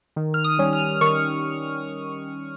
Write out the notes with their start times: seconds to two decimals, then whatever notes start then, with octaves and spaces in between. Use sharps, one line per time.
0.16 D#3
0.34 F6
0.44 D#6
0.59 G3 C#4
0.73 F6
1.01 D#3 C#6